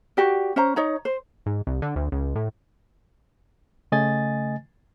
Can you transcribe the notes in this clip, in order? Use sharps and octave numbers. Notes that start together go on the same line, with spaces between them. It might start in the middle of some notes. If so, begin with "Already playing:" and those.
F#4 G4 D5
C#4 C5 A#5
D#4 C#5 A#5
C5
G#2
C2
D3
D2
C#2
A2
C#3 A3 D#5 G#5 A6